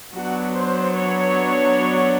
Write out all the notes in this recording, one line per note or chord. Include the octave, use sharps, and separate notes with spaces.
F#3 B3 D4 F#4
C5
C#5